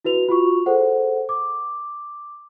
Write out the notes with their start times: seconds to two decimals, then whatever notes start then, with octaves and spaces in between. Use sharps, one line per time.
0.05 E4 F#4 B4 F7
0.29 F4 F#4 C#6
0.66 G#4 A4 C5 F#5
1.29 D6